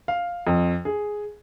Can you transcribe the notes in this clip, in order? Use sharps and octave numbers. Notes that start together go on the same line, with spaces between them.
F5
F2
G#4